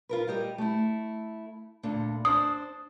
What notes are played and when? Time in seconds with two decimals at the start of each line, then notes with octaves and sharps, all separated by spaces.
0.09 F4 A#4 B4
0.28 G3 G4 D#5
0.58 A3 E4
1.83 D2 A#2 D3
2.25 D4 C5 D#6